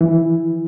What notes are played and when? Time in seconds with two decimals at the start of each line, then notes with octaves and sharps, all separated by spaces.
0.01 E3